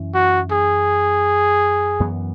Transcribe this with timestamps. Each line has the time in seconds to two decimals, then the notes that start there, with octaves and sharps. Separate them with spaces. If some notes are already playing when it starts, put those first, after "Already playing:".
Already playing: F#2 E3 C#4
0.14 F#4
0.52 G#4
2.00 F#2 E3 B3